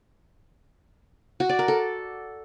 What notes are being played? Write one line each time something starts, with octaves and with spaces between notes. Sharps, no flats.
F#4
D5
A#4
A4